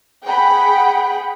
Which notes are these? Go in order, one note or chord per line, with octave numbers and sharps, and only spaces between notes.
G#4 F#5 G5 B5